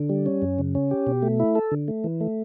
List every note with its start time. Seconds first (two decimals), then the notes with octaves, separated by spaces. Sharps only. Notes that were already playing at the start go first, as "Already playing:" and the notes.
Already playing: D3
0.09 G3
0.26 C#4
0.42 F#2
0.59 C#3
0.75 C#4
0.91 G4
1.07 B2
1.22 A3
1.40 E4
1.55 A4
1.72 D3
1.88 A3
2.04 E3
2.21 A3